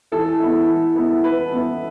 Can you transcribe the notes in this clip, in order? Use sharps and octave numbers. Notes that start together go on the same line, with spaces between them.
E3 A4
B3 E4
E3
B3 E4
E3 B4
B3 E4